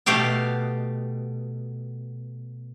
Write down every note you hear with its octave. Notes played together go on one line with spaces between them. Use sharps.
B2 A3 G4 F5 G5